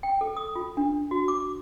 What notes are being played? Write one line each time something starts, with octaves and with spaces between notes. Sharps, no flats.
G5
A4
D#6
F4
D4
F#4
D6